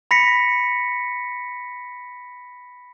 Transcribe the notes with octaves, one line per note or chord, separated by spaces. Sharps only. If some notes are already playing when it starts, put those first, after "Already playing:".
B5 A#6 B6 C#7